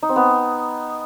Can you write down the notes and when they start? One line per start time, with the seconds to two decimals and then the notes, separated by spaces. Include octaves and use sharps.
0.02 D#4
0.09 C4
0.16 B3